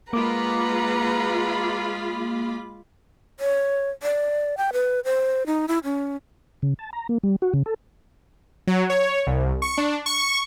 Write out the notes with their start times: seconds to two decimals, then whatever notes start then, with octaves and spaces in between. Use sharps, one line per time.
0.13 G#3 A#3 F4 B4 F#5 A#5 B5 D6
3.40 C#5
4.03 D5
4.57 G5
4.73 B4
5.05 C5
5.46 D#4
5.68 E4
5.84 C#4
6.62 C#3
6.79 A5
6.93 A#5
7.09 A#3
7.23 G3
7.42 F#4
7.54 C#3
7.66 A4
8.67 F#3
8.90 C#5
9.27 C2
9.62 C#6
9.78 D4
10.06 C#6